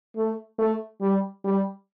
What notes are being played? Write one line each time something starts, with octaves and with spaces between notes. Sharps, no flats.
A3
A3
G3
G3